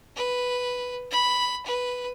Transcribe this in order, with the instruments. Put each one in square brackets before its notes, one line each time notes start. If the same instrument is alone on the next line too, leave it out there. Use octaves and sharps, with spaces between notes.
[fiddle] B4
B5
B4